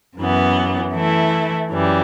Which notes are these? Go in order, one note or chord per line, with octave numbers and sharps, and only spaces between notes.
F#2 E3 B3
E3 A3 E4
F#2 E3 G3